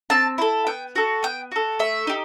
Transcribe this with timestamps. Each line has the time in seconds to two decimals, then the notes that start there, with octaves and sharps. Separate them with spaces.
0.10 C4 A5
0.38 E4 A4
0.67 B3 G5
0.96 F#4 A4
1.23 B3 G5
1.52 F#4 A4
1.80 A3 E5
2.07 D#4 G4